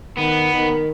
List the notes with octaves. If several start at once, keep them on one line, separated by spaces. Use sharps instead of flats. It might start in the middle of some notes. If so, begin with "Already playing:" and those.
D#3 B3
D#3